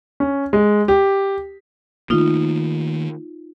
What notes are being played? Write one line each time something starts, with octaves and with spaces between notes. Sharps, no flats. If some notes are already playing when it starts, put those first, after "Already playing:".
C#4
G#3
G4
D#3 A3 A#3 D#4 F4